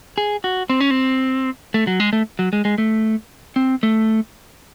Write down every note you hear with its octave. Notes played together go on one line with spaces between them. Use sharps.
G#4
F#4
C4
C#4
C4
A3
F#3
G#3
A3
F#3
G#3
G#3
A3
C4
A3